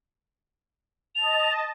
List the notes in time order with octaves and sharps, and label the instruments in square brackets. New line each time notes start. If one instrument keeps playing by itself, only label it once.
[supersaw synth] D#5 A5 [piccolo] F7